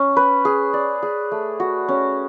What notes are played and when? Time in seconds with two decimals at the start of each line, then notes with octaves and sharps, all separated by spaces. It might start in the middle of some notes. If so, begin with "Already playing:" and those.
Already playing: C#4
0.17 B4
0.45 G#4
0.74 D5
1.03 G#4
1.32 A3
1.60 F#4
1.89 C#4